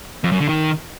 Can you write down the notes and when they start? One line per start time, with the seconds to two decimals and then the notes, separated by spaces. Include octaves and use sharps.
0.24 F2
0.32 F#2
0.40 D3
0.49 D#3